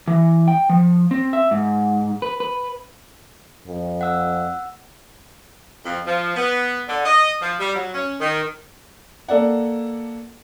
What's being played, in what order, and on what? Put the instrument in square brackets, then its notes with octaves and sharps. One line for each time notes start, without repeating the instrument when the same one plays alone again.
[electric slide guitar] E3
G5
F3
C4
E5
G#2
B4
B4
[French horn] F2
[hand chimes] F#5 E6
[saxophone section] F2
F3
B3
D3
D#5
F3
G3
F#3
C#4
D#3
[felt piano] A#3 A4 D5 F#5